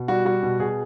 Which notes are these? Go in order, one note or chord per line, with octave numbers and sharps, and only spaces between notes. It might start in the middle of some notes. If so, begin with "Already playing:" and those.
Already playing: B2
G3 F#4
G3 F#4
B2
B2 G#4